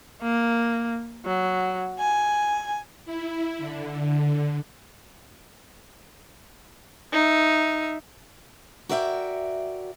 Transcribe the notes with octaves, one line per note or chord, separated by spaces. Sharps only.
A#3
F#3
G#5
E4
D3
D#4 E5
F#4 A#4 D5 E5 F5 G5